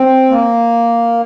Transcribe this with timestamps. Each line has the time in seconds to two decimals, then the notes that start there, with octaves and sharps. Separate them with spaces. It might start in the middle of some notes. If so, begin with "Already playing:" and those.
Already playing: C4
0.29 A#3